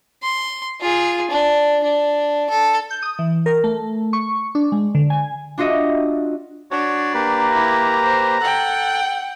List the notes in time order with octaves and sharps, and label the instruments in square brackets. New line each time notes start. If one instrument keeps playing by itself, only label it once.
[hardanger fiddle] C6
F4 G#4
D4
D4
A4
[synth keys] G6
D#6
E3
A#4
A3
C#6
D4
G#3
D3
G#5
[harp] D4 F4 F#4 D#5 E5
[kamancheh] D4 [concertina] F#4 C#5
[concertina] A#3 G4 B4 [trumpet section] A#5
[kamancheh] E4
C5
[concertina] A4 F#6 [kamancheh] F#5 G5